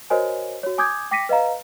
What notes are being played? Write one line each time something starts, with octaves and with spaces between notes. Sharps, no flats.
F#4 A#4 C5 C#5 D#5 G#5
F#4 C#5
G#5 D6 D#6 G6 G#6
G5 D6 A#6 B6 C#7 D#7
B4 D#5 F5 A#5